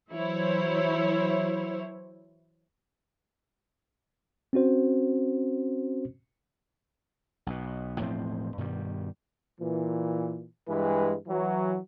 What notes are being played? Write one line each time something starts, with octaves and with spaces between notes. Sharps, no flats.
E3 F#3 E4 C5 C#5
C4 C#4 F#4 C5
B1 B2
E1 A2 F3 C4
G2 B2 D#3 G3
A#2 E3
G2 E3 G#3 B4
E3 F#3